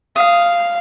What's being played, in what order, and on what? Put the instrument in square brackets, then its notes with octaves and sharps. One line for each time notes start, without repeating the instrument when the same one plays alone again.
[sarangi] F5 [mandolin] D#6